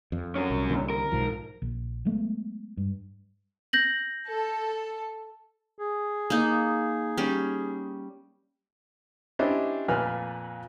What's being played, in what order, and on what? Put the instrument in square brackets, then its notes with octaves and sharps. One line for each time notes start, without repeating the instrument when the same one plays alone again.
[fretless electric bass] F2
[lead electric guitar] F#3 C#4
[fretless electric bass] C2
C2 D3 A#3
[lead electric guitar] A#4
[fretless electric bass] B1 G#2 F3
[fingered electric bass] A#1
F#3 G#3 A3 B3
G2
[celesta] G6 A#6 F#7
[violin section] A4
[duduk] G#4
[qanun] A#3 D#4
G3 C#4
[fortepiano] C#4 D4 E4 G4 C5 D#5
F2 A#2 B4 G#5 F6